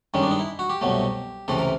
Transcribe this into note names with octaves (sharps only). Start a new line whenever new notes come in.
G2 D#3 G#3 C#4
D4
D#4
E4
F#4
G4
C2 B2 F#3 A3
C#2 C3 E3 A3 A4
A#4